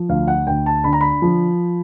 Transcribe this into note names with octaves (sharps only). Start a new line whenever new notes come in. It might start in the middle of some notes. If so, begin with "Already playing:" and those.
Already playing: F3
D2 F5
F#5
D2 G5
A5
D3 B5
A#5
B5
F3